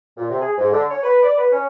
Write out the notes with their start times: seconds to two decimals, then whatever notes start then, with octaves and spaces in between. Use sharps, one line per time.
0.17 A#2
0.30 C3
0.41 G#4
0.58 G#2
0.72 D3
0.89 C#5
1.03 B4
1.22 D5
1.37 B4
1.52 C#4